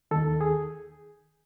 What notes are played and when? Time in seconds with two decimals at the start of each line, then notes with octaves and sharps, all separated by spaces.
0.11 D#2 D#3 A4
0.41 G#4